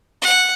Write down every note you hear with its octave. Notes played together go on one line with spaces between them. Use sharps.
F#5